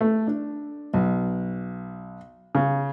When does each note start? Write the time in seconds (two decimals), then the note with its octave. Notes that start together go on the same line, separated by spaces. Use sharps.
0.01 A3
0.27 D4
0.94 B1
2.55 C#3